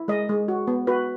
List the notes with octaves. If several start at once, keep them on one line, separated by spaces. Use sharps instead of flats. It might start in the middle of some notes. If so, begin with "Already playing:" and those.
Already playing: E4
G#3 D#5
G#3
F#4
B3
F#4 B4